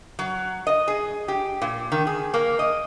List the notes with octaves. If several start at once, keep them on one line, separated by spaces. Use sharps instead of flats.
F#3
D#5
G#4
G4
A#2
D#3
G#4
A#3
D#5